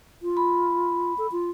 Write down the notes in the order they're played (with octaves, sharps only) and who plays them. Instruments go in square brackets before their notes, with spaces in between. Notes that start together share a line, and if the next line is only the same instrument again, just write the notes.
[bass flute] F4
[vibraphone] B5
[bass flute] A4
F4